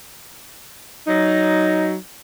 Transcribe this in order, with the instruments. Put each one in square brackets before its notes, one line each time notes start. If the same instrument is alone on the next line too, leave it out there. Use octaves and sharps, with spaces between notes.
[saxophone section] F#3 D#4